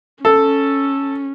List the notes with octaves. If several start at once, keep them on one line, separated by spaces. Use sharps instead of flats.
C#4 A4